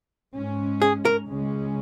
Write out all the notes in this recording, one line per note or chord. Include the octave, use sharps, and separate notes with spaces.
G#2 G#3 C#4
G#4
A#4
C#2 C#3 G#3 C#4